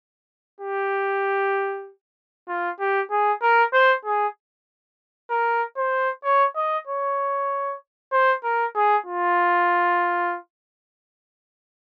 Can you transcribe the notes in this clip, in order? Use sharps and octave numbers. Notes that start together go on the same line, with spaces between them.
G4
F4
G4
G#4
A#4
C5
G#4
A#4
C5
C#5
D#5
C#5
C5
A#4
G#4
F4